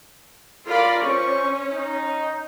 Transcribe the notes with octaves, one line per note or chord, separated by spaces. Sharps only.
F4 A#4 D5 F5 B5
C#4 C5 C#6
D#4